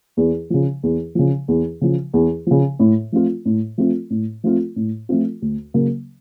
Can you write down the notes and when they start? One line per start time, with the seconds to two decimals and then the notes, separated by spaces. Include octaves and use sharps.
0.17 E2
0.50 C#3 F3
0.83 E2
1.15 C#3 F3
1.48 E2
1.81 C#3 F3
2.13 E2
2.47 C#3 F3
2.79 A2
3.12 F3 A3 C4 F4
3.45 A2
3.78 F3 A3 C4 F4
4.10 A2
4.43 F3 A3 C4 F4
4.76 A2
5.09 F3 A3 C4 F4
5.42 D2
5.74 C#3 F#3 A#3